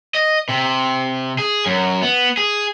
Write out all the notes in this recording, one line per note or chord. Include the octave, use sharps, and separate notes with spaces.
D#5
C3
G#4
F#2
B3
G#4